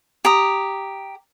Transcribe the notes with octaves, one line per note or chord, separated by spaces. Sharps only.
G4 A#5 D#6